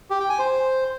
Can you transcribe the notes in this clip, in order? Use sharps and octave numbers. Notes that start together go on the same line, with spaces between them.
G4
G5
G#5
C5